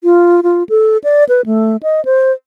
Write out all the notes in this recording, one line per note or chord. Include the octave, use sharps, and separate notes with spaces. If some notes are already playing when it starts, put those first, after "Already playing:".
F4
F4
A4
D5
B4
A3
D#5
C5